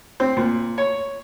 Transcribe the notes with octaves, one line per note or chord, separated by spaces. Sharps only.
C4
A#2
C#5